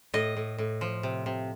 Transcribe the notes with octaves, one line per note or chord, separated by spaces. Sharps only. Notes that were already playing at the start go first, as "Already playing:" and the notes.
A2 D#5
A2
A2
F3
C3
C3